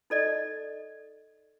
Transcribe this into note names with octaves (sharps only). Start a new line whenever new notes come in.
D#4 A4 D5 D#5